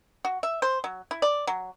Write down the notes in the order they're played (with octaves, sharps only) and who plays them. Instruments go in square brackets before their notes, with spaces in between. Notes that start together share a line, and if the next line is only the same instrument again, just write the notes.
[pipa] F#4
E5
C5
F#3
E4
D5
F#3